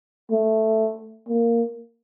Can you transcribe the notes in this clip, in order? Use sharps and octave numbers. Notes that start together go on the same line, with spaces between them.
A3
A#3